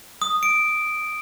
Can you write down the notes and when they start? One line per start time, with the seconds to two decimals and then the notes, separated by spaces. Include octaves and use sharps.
0.22 D#6
0.43 D7